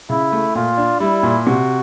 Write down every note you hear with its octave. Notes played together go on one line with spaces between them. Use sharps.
C#3 E4
A3
A#2 F4
D4
G3 E4
A#2
C3 F#4